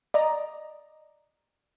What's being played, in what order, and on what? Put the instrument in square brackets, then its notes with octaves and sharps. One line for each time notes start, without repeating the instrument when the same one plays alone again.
[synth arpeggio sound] D5 D#5 A#5